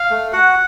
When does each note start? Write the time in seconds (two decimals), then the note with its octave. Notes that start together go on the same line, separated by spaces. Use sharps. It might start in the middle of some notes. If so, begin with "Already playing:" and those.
Already playing: F5
0.10 A3
0.33 F#4 F#5